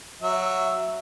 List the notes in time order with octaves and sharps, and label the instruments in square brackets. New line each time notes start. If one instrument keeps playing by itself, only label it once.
[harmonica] F#3 E5